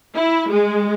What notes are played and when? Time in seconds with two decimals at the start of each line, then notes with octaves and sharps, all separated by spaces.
0.16 E4
0.52 G#3